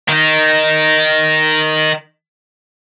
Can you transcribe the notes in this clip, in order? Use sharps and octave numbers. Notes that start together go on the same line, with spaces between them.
D#3 D#4